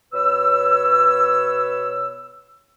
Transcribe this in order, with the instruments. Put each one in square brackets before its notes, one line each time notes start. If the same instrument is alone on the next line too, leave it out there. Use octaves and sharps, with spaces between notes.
[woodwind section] B2 B4 C#5 E6